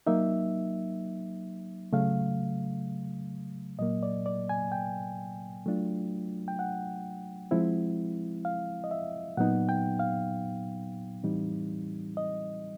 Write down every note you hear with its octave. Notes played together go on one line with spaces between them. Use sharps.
F#3 A#3 D#4 E5
C#3 F#3 A3 F5
A#2 F#3 A#3 D#5
D5
D5
G#5
G5
F#3 A3 D4 F4
G5
F#5
F3 G#3 C4 E4
F5
D#5
E5
A#2 F#3 B3 D#4 F#5
G5
F5
A2 E3 G3 C4 D#4
D#5